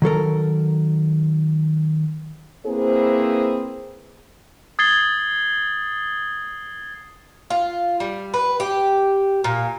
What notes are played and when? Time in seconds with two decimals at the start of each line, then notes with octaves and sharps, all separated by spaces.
0.02 D#3 F#3 A4 A#4
2.66 A#3 C4 E4 G#4 B4 C5
4.79 D#6 G#6 A6 C7 G7
7.50 F4
8.00 G3
8.34 B4
8.60 G4
9.44 A#2